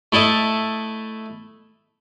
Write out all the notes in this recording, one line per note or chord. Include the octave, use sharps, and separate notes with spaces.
A3 E4 A4 D#5